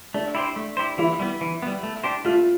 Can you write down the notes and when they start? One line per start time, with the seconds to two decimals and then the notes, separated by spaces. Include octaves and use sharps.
0.14 A3 D4
0.35 E4 G4 C5
0.56 A3
0.77 E4 G4 C5
0.98 E3 E4
1.19 G3 B3
1.41 E3
1.62 G3 B3
1.83 A3
2.04 D4 G4 C5
2.25 A3 F4